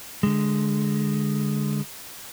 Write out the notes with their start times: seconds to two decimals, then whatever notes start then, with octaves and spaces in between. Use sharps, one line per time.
0.23 D3 G#3